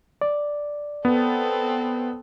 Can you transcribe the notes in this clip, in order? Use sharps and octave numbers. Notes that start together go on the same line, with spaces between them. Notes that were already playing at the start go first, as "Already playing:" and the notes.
D5
B3 C4 A4